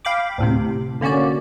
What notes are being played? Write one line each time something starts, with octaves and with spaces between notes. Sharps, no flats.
F5 G5 B5 D6
D2 A2 C3
D3 A#3 C#4 F#4 D5